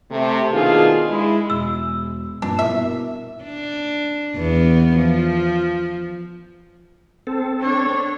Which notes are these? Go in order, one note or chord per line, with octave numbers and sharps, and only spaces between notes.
C3 A3
B2 D#3 A#3 D4 F4 G#4
G#3 E4
E1 E6
G2 A#2 D4
B2 E4 A#4 E5
D4
E2 B3
F3
C4 A4
D4 C#5